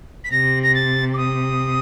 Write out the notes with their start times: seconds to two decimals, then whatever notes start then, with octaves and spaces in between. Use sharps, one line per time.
0.24 B6
0.31 C3 A#6
0.63 A#6
0.75 A6
1.14 D6
1.17 D#6